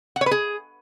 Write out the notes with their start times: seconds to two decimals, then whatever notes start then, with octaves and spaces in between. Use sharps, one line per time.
0.16 F#5
0.21 C#5
0.26 B4
0.31 G#4